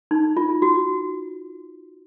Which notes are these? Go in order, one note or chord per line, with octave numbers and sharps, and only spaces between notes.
D#4
F4
F#4